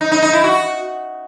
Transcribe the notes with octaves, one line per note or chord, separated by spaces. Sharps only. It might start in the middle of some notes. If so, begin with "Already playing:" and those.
D#4
D#4
D#4
E4
F#4